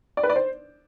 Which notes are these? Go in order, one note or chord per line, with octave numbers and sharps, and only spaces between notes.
D5
B4
D5
C5